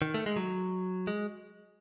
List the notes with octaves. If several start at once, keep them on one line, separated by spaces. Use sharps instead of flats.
D#3
A3
G#3
F#3
G#3